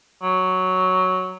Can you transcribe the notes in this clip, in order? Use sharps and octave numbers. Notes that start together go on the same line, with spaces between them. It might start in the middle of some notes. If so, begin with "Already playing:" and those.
F#3